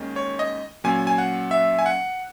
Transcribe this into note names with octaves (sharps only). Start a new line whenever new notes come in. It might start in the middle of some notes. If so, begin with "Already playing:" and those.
Already playing: D#2 D#3 G#3 C#4
C#5
D#5
A#2 F#3 C#4 G#5
G#5
F#5
E5
G#5
F#5